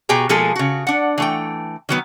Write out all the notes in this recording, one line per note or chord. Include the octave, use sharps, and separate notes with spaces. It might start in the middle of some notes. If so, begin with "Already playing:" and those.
B2 G4 G#4 G5 A#5
B2 F3 G#3 A#3 G#4 A4
C#3 F#4
D4 F#5
E3 A3 G5
D#3 F#3 B3